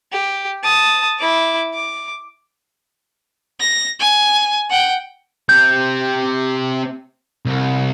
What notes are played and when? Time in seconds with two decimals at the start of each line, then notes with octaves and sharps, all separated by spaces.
0.12 G4
0.64 A5 D#6
1.19 E4 D6
1.74 D6
3.60 A#6
3.99 G#5
4.70 F#5 G5
5.49 C4 G4 G6
7.45 C2